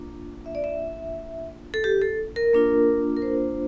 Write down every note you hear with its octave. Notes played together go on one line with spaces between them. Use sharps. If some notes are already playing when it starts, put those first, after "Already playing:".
Already playing: A#3 D4 F4
E5
D5
E5
A4
G4
A4
A#4
A#3 D4 F4
A#4
C5